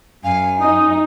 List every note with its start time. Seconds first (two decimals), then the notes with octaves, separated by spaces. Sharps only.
0.24 F#2 F5 G#5
0.61 D#4 D#6